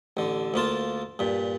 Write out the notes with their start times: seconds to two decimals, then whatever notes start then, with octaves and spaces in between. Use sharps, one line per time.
0.17 A1 D3
0.54 D2 A#3 F4 A5
1.19 G2 A#2